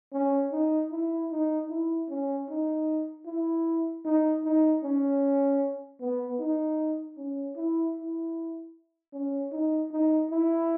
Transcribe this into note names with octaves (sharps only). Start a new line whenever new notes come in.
C#4
D#4
E4
D#4
E4
C#4
D#4
E4
D#4
D#4
C#4
B3
D#4
C#4
E4
E4
C#4
D#4
D#4
E4